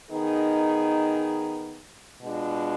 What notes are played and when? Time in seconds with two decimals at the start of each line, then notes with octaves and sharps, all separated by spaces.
0.10 D#3 B3 D#4 G#4
2.23 B2 G#3 D4 F4